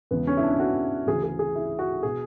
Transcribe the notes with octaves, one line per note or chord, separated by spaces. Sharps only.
E1 E2 C#3 E3 B3
C#4
E4
D4
F#4
D2 C#3 E3 G#4
G#4
G#4
E4
F#4
B2 G#4